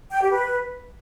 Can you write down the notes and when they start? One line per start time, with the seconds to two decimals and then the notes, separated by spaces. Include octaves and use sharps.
0.11 G5
0.21 G4
0.32 B4